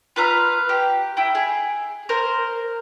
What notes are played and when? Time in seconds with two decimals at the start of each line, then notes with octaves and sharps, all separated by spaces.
0.16 F4 B4 A#5 F6
0.69 G4
1.17 E4 G5
1.35 G#4
2.09 A#4 C5